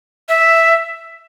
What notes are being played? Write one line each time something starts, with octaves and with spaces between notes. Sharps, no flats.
E5